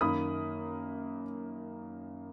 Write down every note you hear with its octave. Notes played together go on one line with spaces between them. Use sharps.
F#2 D#3 A#3 B5 D#6